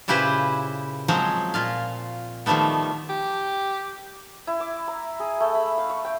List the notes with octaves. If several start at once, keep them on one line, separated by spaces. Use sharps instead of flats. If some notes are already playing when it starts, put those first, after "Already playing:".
A#2 C#3 E4 G4 B4 C5
F3 F#3 G#3 C4
A#2 F4 F5
D#3 F3 G3 A3 B3
G4
E4
D6
A#5
G#4
A3
B5
F5
C#6
G5